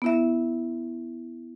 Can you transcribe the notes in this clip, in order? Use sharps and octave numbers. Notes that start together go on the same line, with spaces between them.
B3 E4 E5